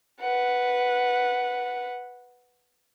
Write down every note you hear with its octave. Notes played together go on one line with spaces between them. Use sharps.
B4 F#5